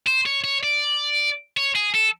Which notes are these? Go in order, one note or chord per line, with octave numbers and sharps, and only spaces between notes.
C5
C#5
C#5
D5
C#5
G#4
A4